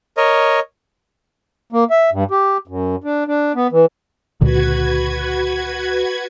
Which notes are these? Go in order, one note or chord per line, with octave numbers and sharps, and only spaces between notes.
A#4 C#5 D#5
A#3
E5
G2
G4
F#2
D4
D4
B3
E3
C#2 A#2 D3 F#4 B4 G#6